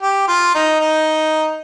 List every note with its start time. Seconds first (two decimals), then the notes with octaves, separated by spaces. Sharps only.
0.02 G4
0.28 F4
0.55 D#4
0.80 D#4